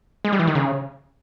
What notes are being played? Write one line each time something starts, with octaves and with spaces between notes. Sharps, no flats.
G#3
G3
E3
D#3
C#3